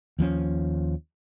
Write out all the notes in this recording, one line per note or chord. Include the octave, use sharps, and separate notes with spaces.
D#2 F3 F#3 C#4